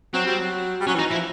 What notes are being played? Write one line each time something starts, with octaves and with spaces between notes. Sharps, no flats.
F#3 C4
G3
F#3
G3
F#3 C#4
E3
D#4
E3 F3 E4